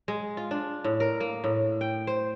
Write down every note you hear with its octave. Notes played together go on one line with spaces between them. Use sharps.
G#3
F4
D4
A2
A#4
A#3
A2
G5
C5